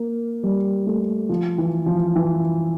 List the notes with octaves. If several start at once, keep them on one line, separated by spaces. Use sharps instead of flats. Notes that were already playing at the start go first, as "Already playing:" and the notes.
Already playing: A#3
G3
A3
F3
E3
F3
E3